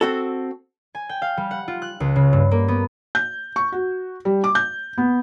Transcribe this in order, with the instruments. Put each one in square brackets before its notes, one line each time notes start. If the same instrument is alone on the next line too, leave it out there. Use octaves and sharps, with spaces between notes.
[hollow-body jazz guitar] C4 F#4 A4
[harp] G#5
G5
F5
G3
F#5
F4
F#6
C#2
C#3
G2
A#3
B3
[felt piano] G6
C#6
F#4
G3
D6
G6
B3